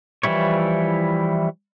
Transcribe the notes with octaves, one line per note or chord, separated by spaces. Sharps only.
E3 F3 G3 E4 C#5